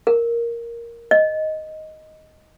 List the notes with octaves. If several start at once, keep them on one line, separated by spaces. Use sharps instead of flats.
A#4
D#5